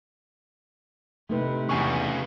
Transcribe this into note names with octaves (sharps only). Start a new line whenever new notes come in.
C3 A3 D#4 B4
E2 C#3 B3 G#5 C#6